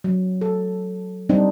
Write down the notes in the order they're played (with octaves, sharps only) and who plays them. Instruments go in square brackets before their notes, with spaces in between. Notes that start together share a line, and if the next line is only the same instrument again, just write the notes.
[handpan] F#3
A4
G3 C4 D4 D#4